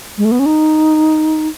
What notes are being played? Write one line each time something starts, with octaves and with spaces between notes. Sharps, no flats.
G#3
A3
B3
C#4
D#4